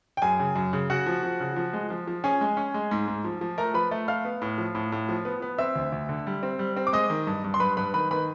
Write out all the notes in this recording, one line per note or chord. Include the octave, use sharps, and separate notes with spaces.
G5
F#2 G#4 G#5
C#3
F#2
C#3
C#3 F#4 F#5
F3
F3
C#3
F3
G#3
F3
F3
C#4 G#4 G#5
G#3
C#4
G#3
G#2
G#2
F3
F3
A3 A#4 A#5
F3 B4 B5
A3
A3 F5 F6
B3
A2
F3
A2
A2
F3
B3
B3
C4 E5 E6
D2
D2
D3
G3
C4
G3
C4
D6
G#3 D#5 D#6
D#3
G2
G2
C6
G2 B4 B5
G2 B4 B5
D#3 B4 B5
D#3 B4 B5